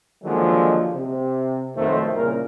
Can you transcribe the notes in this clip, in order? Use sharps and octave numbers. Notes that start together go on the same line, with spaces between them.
D3 D#3 F3 F#3 G#3 A#3
C3
B1 F2 D#3 A3 C5
C2 A#2 C#3 A#4